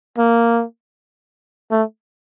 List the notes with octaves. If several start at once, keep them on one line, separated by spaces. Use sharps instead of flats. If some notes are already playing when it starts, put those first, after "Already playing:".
A#3
A3